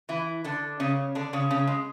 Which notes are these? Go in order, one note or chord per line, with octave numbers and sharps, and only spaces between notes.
E3 E4
D3 D4
C#3 C#4
D3 D4
C#3 C#4
C#3 C#4
G#3